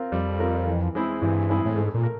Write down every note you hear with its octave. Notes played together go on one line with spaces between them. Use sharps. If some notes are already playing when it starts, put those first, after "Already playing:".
Already playing: C4 F4 A#4
F2 G3
C4 F4 A#4
E3
G#3 C4 E4 G#4
G2 E3
G#3 C4 E4 G#4
A2
G#2 A3
A#2
A#4